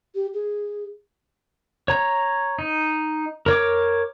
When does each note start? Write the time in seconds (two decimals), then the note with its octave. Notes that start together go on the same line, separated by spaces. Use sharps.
0.15 G4
0.34 G#4
1.88 C#5 A#5
2.59 D#4
3.46 A#4 C#5 D6